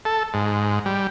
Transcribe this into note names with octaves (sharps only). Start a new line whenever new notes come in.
A4
G#2
G3